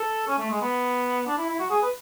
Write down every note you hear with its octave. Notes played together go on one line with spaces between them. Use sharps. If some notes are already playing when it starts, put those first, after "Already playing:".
Already playing: A4
C#4
A3
G#3
B3
D4
E4
E4
F#4
G#4
B4